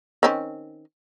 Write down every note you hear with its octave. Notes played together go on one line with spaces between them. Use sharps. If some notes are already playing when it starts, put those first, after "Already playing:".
D#3 C4 C#4